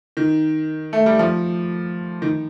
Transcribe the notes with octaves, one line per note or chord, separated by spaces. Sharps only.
D#3
A3
G3
F3
D#3